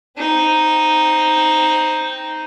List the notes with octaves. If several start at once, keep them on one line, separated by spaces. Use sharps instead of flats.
C4 D#4